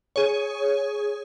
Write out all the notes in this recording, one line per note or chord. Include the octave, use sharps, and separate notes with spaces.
G#4 C#5